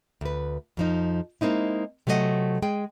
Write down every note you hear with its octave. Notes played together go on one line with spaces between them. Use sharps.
D2 B4
F2 F3 D#4
G#3 A#3 C4 D#4 E4
C3 F#3 A3 B3 D#5 F#5
G#3 G#4 G5